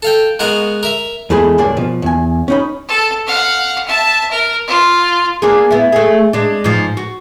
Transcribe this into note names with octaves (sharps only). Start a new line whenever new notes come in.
A4 F5 G5
G#3 B3 F#4 A#4 F5
A#4 E5
E2 E3 G#3 A3 G#4 B5
C#2 G2 A#3 D4 D5 G#5
B2 F3
E2 G#5
C#4 D#4 B5
A4
F5 F#5
E5 A5
A#4
F4
A#3 D4 G#4
B3 E4
A3 G#4
G#3 D4
G#2 F3
F#4